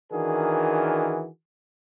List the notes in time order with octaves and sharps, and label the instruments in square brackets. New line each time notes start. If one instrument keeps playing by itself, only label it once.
[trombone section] D#3 E3 D4 F#4 G#4 A#4